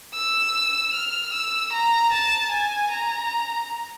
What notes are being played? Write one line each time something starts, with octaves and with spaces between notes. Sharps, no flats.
E6
F6
E6
A#5
A5
G#5
A#5